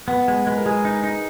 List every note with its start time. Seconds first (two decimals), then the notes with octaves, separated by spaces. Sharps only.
0.08 B3 B4
0.28 G#3
0.47 G#3 B4
0.56 A#4
0.65 G#3 G#4
0.85 D#4
1.04 D#4